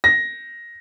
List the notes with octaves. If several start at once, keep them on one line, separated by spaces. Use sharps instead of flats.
A#6